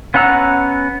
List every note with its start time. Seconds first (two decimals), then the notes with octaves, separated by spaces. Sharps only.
0.14 B3 C#4 F#5 A#5 E6